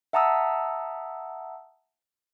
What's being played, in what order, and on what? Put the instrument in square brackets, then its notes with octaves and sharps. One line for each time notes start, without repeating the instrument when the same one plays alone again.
[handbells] E5 F#5 A5 A#5 D#6 E6